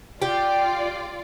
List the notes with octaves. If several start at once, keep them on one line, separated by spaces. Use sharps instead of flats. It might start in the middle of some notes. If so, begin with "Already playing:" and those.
F4 G4 D5